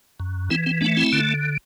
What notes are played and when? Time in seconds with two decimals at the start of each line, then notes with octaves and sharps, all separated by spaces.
0.20 F#2
0.50 E3 C4 E4
0.66 C4
0.81 A3 B3 D4
0.97 C4 E4
1.13 D3